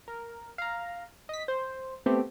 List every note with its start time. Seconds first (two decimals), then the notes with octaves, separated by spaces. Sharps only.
0.08 A#4
0.58 F5 A#5
1.29 D#5 B6
1.48 C5
2.06 A3 B3 C4 G4